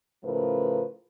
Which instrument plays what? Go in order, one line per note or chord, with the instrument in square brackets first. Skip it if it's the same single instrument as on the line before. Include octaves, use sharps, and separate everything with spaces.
[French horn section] A2 C#3 F3 A#4 B4